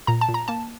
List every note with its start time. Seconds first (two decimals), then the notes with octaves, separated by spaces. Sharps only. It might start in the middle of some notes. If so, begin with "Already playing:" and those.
0.07 A#2 A#5
0.21 A5
0.28 A#2
0.34 A#5
0.48 A#3 A5